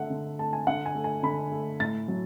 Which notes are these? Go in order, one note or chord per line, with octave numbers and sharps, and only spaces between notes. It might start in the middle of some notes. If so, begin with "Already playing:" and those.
Already playing: D3 A3 E5 F#5
D3
A3 A5
G#5
D3 F#5
G#5
A3
G#5
D3 B5
A3
A2 A6
F#3